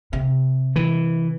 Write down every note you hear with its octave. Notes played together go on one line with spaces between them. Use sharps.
C3
E3